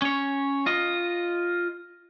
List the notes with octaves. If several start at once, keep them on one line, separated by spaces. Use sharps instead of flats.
C#4 C#5
F4 D#5